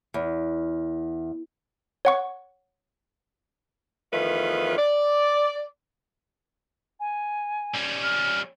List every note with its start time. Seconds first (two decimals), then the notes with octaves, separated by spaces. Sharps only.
0.14 E2
2.05 C#5 F#5 C#6
4.12 E2 D#3 F3 A3 F4 B4
4.78 D5
7.00 G#5
7.74 G3 C#4
8.03 F6